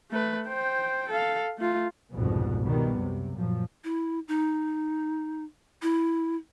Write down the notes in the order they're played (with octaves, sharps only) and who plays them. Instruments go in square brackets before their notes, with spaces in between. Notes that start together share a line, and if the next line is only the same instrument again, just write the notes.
[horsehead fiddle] A3 B4
C5 G5
A4 F5
A3 F4
[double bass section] C2 F2 G#2 B2
B2 D#3 G3 B3
F#2 C3
F#2 A#2 F3
[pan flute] E4
D#4
E4